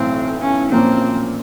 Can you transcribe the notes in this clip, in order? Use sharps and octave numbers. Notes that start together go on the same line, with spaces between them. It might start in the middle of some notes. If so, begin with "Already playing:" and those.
Already playing: B1 A2 E3 C4
C#4
A#2 F3 A#3 C4 C#4